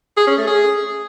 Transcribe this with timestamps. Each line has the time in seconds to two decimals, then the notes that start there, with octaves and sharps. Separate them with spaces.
0.17 G#4
0.27 C#4
0.37 A3
0.47 G#4